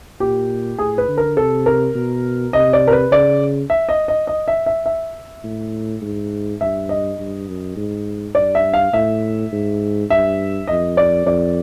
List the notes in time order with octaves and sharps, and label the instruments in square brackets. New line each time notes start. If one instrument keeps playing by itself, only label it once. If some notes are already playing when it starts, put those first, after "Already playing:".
[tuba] A#2 [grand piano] G4
[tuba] A2 [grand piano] G#4
[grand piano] B4
[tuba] D3
[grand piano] A#4
[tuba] C3 [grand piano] A4
[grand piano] A#4
[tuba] B2
[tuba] C3 [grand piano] D#5
[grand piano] D5
A#4
B4
[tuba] C#3 [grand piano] D5
[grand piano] E5
D#5
D#5
D#5
E5
E5
E5
[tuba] A2
G#2
[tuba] G2 [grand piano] E5
[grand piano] D#5
[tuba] G2
F#2
G#2
[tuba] G2 [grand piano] D5
[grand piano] E5
F5
[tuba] A2 [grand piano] E5
[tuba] G#2
[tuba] G2 [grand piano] E5
[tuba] F2 [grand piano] D#5
[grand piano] D5
[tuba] F2 [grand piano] D5